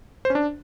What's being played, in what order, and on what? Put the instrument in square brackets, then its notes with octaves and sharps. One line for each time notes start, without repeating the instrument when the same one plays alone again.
[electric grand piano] C5
C#4
D4